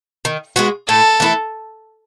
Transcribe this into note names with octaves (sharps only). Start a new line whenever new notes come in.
D#3
G#3 B3 F#4
A2 A4
E3 A3 E4